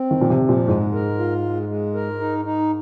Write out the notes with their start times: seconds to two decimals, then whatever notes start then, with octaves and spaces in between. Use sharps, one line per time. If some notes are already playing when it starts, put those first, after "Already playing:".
Already playing: C4
0.11 D#3
0.17 A#2 F3
0.30 C3
0.43 F3
0.49 A#2
0.68 G#2 G#3
0.94 A#4
1.19 F4
1.44 G#3
1.69 G#3
1.94 A#4
2.20 D#4
2.45 D#4